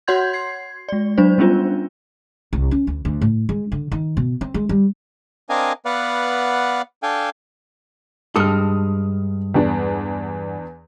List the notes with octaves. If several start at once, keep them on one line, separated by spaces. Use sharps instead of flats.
F#4 C#5 F#5 C6 G6 G#6
G#6 C7
G#3 D5
F#3 D4 C5
G3 B3 C#4 D4 F4
C2
C#4
D2
D2
A2
G#3
D3
D#3
B2
C4
G#3
G3
C4 D4 A#4 D#5 F5 G#5
B3 B4 D5 F5 F#5
D4 A4 F5 G5 G#5
G2 G#3 A4 D#6 F6
E2 B3 D4